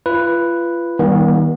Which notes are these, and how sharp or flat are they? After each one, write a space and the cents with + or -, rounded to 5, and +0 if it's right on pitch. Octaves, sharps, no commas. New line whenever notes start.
F4 -30 B4 +0
D#3 +30 G3 +0 B3 -40